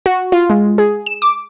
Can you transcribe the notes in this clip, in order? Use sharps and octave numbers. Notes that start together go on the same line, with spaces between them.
F#4
F4
G#3
G#4
E7
D6